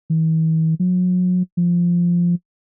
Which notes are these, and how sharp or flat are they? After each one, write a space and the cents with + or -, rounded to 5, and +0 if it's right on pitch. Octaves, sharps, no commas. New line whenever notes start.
E3 -45
F#3 -35
F3 -5